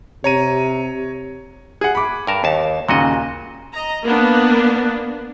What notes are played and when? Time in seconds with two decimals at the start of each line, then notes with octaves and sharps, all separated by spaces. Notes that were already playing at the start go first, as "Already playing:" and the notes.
0.24 C3 C#5 A#5 D#7
1.81 G#4 F#5
1.95 B5 D6
2.27 G2 A#4 A5
2.44 D#2 A5
2.89 D#2 A#2 C#3 F#4 D#5
3.73 D#5 A#5
4.04 A#3 B3 D4